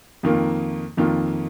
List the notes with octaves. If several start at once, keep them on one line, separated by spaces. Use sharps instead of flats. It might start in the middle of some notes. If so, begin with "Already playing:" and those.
F2 D#3 A#3 F4
F2 D#3 A#3 F4